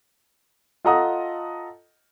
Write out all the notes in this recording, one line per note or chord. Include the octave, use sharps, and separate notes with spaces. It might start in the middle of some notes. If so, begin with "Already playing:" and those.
F4 A4 D#5 F#5 A#5 D#6